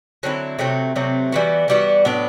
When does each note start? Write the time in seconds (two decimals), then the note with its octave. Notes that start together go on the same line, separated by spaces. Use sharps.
0.23 D3 F#3 C4 E4
0.59 C3 F#3 A3 C4
0.96 C3 F#3 A3 C4
1.32 E3 G3 B3 F#4
1.68 E3 G3 B3 F#4
2.05 A2 F#3 B3 D4